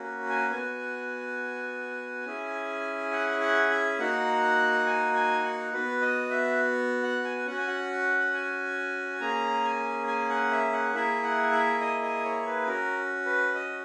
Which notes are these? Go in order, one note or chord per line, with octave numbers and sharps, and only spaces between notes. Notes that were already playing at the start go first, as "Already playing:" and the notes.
Already playing: A#3 C#4 F#4
G#5
B3 F#4 G#5
C#4 E4 G#4
F#5
F#5
E5
A#3 D#4 F#4 F#5
G#5
G#5
F#5
B3 F#4 B4
D#5
E5
F#5
G#5
C#4 F#4 F#5
G#5
F#5
G#5
A#3 C#4 G#4 A#5
G#5
G#5
F#5
E5
F#5
A#3 E4 G#4 E5
F#5
E5
D#5
D#5
C#5
B4
C#4 F#4 A#4
B4
D#5